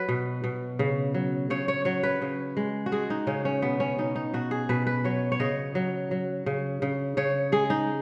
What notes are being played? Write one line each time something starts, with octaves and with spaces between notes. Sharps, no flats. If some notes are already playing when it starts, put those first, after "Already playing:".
Already playing: F#3 B4
B2
B2
C#3
F#3
C#3 C#5
C#5
F#3 C#5
B4
C#3
G#3
F#4
G#3 G#4
D#4
C#3 C#4
C#4
B2 B3
C#4
B2 D#4
D#4
B2 F#4
G#4
B2 B4
B4
F#3 C#5
C#5
C#3 D#5
F#3
F#3
C#3
C#3
C#3 C#5
G#3 G#4
D#4